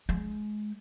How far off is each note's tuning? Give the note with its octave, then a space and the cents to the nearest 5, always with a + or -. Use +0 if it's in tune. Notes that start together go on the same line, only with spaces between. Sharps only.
G#3 +25